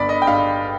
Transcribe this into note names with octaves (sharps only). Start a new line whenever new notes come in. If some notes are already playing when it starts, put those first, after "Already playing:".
Already playing: G1 D3 D5 B5
D#5
G5
G2 F5